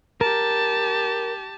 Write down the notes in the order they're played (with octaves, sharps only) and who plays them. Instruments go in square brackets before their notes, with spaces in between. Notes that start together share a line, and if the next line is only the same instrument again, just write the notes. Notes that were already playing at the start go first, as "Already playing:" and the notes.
[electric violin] G4 A5 [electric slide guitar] A#4